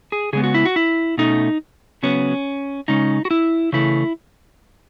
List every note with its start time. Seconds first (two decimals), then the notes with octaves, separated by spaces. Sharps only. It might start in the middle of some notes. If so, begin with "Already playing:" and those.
0.12 G#4
0.33 C#3 G#3 B3 G#4
0.43 F#4
0.54 E4
0.65 F#4
0.76 E4
1.18 B2 A3 C#4 D#4
2.03 C#3 F#3 B3 C#4
2.88 C#3 G#3 C#4 D#4
3.25 F#4
3.31 E4
3.73 C#3 E3 A3 E4